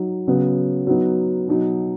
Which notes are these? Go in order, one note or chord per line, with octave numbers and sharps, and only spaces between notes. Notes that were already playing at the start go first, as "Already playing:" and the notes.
Already playing: F#3 D#4
C#3 F#3 B3
F#3 B3 D#4
B2 F#3 D#4